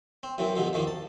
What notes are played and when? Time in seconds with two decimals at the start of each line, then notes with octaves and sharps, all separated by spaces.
0.23 C4
0.38 F#2 E3 C4
0.56 G2 B2 D3 F3
0.73 E2 D#3 F3 A#3
0.87 A5